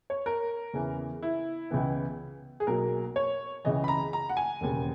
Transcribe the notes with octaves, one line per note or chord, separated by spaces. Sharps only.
C#5
A#4
E2 C#3 E3
E4
C#2 C#3 E3 B3
G#4
B1 B2 F#3 A#3 A#4
C#5
C#2 C#3 E3 D#5
B5
A#5
A#5
F#5
G#5
E1 D#2 C#3